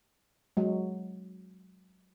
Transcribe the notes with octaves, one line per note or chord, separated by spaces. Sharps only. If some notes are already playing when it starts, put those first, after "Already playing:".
F#3 G#3